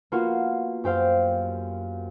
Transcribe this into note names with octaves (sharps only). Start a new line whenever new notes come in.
A#3 B3 F4 F#4
F#2 G4 C5 F5